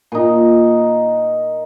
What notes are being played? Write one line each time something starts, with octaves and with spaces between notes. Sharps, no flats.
A#2 D#4